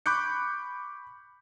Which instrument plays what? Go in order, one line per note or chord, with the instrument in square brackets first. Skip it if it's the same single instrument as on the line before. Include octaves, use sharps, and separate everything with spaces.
[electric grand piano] B5 C#6 D6 F#6 G6 C#7